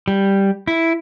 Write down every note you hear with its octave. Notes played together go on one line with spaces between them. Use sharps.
G3
E4